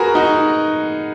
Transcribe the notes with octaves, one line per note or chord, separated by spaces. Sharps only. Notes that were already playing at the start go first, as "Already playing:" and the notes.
Already playing: F#4 G#4 A#4 B4
D#4 F#4